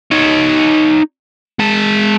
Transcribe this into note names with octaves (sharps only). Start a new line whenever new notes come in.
D#4 C#5
G#3 A5